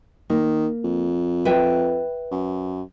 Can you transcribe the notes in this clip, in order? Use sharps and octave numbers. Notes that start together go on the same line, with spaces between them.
D#3 A#3
F2
B4 E5 G5
F#2